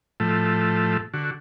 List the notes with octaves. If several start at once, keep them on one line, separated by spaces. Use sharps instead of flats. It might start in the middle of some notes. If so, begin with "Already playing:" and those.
A2 F3 A3
D3 F#4